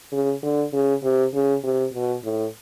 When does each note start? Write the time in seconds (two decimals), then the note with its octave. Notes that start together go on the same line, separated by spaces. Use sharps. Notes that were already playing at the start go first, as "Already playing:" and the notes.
0.12 C#3
0.43 D3
0.73 C#3
1.03 C3
1.34 C#3
1.64 C3
1.94 B2
2.24 A2